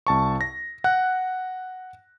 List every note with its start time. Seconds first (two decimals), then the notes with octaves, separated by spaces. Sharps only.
0.07 C2 A5 C#6
0.41 A#6
0.84 F#5 F#6